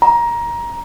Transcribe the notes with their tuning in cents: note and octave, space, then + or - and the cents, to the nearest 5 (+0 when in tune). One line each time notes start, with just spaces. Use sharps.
A#5 +20